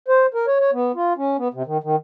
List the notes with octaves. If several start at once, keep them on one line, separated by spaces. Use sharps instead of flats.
C5
A#4
C#5
C#5
B3
F4
C#4
B3
C3
D#3
D#3